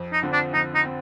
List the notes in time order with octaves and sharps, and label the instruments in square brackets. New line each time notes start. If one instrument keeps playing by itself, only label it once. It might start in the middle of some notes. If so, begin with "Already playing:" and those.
Already playing: [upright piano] F2
[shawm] D#4
[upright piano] D3 F3 C4
[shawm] D4
[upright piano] F2 [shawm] D#4
[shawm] D#4
[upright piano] C4